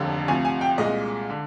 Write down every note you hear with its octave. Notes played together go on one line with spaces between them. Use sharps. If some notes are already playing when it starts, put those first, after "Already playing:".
Already playing: F1 D#2 D3
D2 C3 F3 G#5
G#5
G5
C2 A#2 G#3 D#5
D3